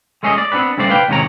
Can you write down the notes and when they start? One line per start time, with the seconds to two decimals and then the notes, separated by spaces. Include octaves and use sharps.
0.23 G#3 A3 C#4 G#4 C5 D#5
0.38 D5
0.52 B3 C4 D4 G4 B4
0.78 G2 C#3 A3 C5 D5
0.89 B4 F5 G5
1.08 D#2 G#2 C3 D#3 C#5 A#5